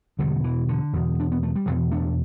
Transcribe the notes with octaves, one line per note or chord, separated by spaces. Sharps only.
E1 E2 B2 D3 G3
E3
D3
E1 E2 B2
D4
B3
A3
G3
E1 E2 B2 E3
A3 D4